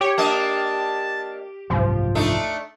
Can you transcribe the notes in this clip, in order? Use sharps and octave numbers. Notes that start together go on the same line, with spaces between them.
G4 C#5
A#3 D4 D#5 A5
F#1 C2 G#2 F3
A3 D4 D#4